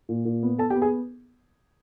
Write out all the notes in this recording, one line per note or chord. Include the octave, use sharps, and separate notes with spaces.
A#2
A#2
B3
B3 A4 A5
G4 G5
B3
G#4 G#5